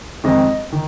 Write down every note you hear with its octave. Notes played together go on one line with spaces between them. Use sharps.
F2 D#3 G#3 C4 D#5
D#3